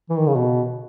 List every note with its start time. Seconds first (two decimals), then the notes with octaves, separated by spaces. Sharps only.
0.10 E3
0.19 D#3
0.28 C#3
0.36 B2